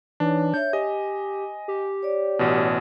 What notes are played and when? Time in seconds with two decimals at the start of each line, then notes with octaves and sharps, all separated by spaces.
0.20 E3 D4 D#4 C#5
0.54 C#5 E5 G6
0.73 G4 D#5 G#5
1.68 G4
2.03 C#5 D5
2.39 A1 B2